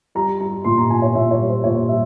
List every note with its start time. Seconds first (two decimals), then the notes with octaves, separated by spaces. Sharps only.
0.15 G3 A#5
0.40 G3 A#5
0.64 A#2 C6
0.78 A#5
0.89 A#2 G#5
1.02 C#5
1.15 A#2 E5
1.31 C#5
1.40 G3
1.48 C5
1.64 A#2 C#5
1.89 G3 E5